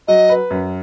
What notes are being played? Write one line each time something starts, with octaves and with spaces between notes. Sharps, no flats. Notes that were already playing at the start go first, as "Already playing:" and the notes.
F#3 D#5
B4
F#2